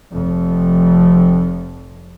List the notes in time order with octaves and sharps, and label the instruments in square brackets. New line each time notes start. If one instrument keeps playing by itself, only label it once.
[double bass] F1 F2